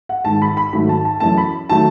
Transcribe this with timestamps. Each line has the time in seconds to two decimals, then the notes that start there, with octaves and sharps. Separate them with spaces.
0.09 F#5
0.25 G#2 D#3 G#3 A5
0.42 B5
0.57 B5
0.73 G#2 D#3 F#3 A3 B5
0.89 A5
1.05 A5
1.20 F#2 E3 A3 A5
1.38 B5
1.69 D#3 F#3 A3 A5